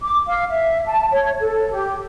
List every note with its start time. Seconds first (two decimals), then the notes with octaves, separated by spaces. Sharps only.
0.01 D6
0.27 F5
0.50 E5
0.86 A5
1.11 C#5
1.41 A4
1.71 G4